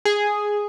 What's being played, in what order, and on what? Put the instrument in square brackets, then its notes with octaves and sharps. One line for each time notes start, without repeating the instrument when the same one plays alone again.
[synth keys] G#4